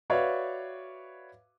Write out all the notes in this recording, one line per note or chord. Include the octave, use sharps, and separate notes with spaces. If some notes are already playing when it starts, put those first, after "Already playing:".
F#4 B4 C#5 D5 E5 F5